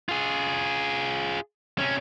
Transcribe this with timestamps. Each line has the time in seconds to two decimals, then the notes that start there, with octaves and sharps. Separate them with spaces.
0.09 F4 G#4
1.78 C3 C#4